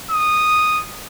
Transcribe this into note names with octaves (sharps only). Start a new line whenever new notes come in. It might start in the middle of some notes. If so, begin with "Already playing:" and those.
D#6